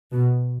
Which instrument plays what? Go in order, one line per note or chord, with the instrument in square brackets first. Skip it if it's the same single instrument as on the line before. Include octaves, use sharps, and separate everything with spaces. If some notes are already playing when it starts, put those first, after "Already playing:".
[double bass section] B2